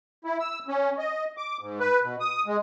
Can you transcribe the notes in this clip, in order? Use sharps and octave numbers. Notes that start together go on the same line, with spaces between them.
E4
E6
C#4
D#5
D6
G#2
B4
B2
D#6
G#3